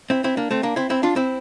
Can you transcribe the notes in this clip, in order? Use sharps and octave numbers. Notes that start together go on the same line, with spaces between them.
C4 E4
C4 E4
A#3 D4
A3 C4
A#3 D4
C4 E4
C4 E4
D4 F4
C4 E4